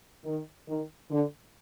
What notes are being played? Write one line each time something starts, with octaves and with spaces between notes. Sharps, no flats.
D#3
D#3
D3